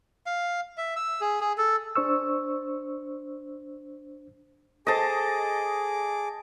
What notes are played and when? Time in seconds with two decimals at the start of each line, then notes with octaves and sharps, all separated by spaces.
0.26 F5
0.78 E5
0.96 E6
1.21 G#4
1.41 G#4
1.58 A4
1.95 D4 C5 C#6 E6
4.87 G#4 A4 C5 D#5 A5 D6